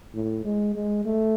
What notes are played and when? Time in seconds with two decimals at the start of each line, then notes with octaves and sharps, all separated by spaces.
0.15 A2
0.45 G#3
0.76 G#3
1.05 A3